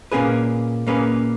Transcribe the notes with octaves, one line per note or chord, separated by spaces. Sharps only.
A#2 A#3 C#4 G#4 B4
A#2 A#3 C#4 G#4 B4